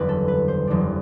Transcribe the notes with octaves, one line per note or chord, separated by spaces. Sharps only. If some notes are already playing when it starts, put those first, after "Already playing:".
Already playing: F#1 E2 D3 G3 B4
A4
B4
C5
F#1 E2 D3 G3